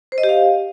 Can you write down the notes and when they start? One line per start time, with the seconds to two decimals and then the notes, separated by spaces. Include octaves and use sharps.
0.12 C5
0.18 D#5
0.23 G4
0.29 F5